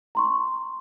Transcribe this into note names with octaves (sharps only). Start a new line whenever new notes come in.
A#5 C6 C#6